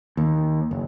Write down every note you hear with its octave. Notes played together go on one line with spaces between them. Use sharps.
D#2
F#1